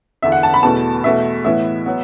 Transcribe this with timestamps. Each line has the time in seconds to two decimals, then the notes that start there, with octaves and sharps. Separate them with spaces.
0.23 E2 D3 B3 E5
0.32 F#5
0.43 A5
0.54 B5
0.63 E2 B2 A3 A5
1.04 E2 B2 A3 E5
1.44 A2 E3 B3 E5
1.86 F#3 B3